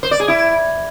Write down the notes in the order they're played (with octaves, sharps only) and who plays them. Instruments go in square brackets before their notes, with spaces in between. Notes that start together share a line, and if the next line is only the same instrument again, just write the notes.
[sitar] C5
D5
G#4
E4